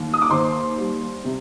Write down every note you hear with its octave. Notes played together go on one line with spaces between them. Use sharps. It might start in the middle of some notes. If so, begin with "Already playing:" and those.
Already playing: D#2
D#6
D6
D#2 C5 C6
G3
C3